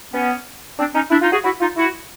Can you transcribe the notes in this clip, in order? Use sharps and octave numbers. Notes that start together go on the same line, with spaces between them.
B3 C#4
C4 D4
C#4 D#4
D4 E4
D#4 F4
F#4 G#4
E4 F#4
D#4 F4
E4 F#4